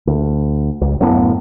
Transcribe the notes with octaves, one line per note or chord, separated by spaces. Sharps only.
D2
C#2
D1 F#2 A2 B3